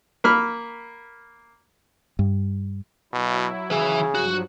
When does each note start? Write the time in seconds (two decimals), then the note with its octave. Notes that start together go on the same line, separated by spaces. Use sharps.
0.24 A#3 B5 F6
2.19 G2
3.13 B2 F#3 E4
3.71 C#3 E3 G#4 E5
4.15 G2 F3 F#3 F#4